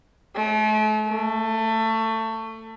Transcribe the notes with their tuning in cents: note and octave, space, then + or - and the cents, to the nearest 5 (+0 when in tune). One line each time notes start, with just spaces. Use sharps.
A3 -40
A3 +20